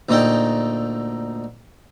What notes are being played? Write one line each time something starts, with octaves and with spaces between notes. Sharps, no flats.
D2 A#2 D#4 A4 G5